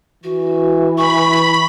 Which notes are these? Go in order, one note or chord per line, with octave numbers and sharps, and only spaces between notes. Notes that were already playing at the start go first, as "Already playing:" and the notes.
E3 F#4
B5 C#6